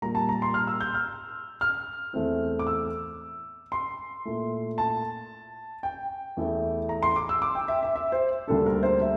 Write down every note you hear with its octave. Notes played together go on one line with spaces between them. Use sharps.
A#2 G3 A#3 A#5
A5
A#5
C6
F6
E6
G6
F6
F6
E2 E3 A3 C4 E4
D6
E6
C6
A#2 A3 E4
A5
G5
E2 E3 A3 E4
A#5
C6
D6
E6
D6
G5
E5
E5
E5
C5
D2 D3 G3 A#3 D4 A4
A#4
C5
E5